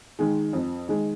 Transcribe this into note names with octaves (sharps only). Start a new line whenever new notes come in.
D#3 G#3
F2
D#3 G#3